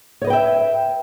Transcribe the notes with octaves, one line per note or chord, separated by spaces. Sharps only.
B4 C#5 D#5 E5 G5